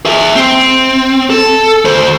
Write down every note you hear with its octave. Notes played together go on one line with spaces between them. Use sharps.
G#4 E5
C4
A4
D2 C5